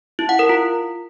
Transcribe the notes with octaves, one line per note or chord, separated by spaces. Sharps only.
E4
F#5
A#4
F4